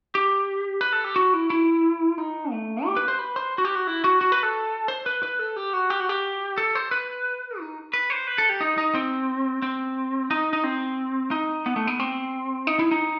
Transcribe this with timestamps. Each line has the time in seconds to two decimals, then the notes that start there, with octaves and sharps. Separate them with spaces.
0.15 G4
0.81 B4
0.93 A4
1.04 G4
1.16 F#4
1.34 E4
1.50 E4
2.18 D#4
2.51 A3
2.86 G4
2.97 B4
3.08 C5
3.19 B4
3.36 C5
3.58 F#4
3.65 G4
3.75 F#4
3.87 E4
4.04 F#4
4.21 F#4
4.32 B4
4.43 A4
4.88 C5
5.06 B4
5.23 B4
5.39 A4
5.56 G4
5.73 F#4
5.90 G4
6.00 F#4
6.09 G4
6.58 A4
6.75 C5
6.91 B4
7.59 D#4
7.94 B4
8.10 C5
8.27 B4
8.38 A4
8.49 G4
8.61 D#4
8.78 D#4
8.95 C4
9.62 C4
10.31 D#4
10.53 D#4
10.64 C4
11.31 D#4
11.66 B3
11.76 A3
11.87 B3
12.00 C4
12.67 D#4
12.79 E4
12.91 D#4